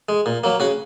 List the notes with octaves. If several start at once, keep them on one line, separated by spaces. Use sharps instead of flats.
G#3
A#2
F#3 A#3
C#3 F#4